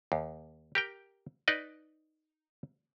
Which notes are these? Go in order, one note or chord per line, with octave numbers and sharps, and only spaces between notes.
D#2
G4 A#4 G5
D#4 B4 D5 D#5